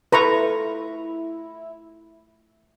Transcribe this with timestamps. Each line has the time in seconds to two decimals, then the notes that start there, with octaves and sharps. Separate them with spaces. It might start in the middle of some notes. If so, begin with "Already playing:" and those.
0.12 A3 E4 F4 A4 B4 A#5 C#6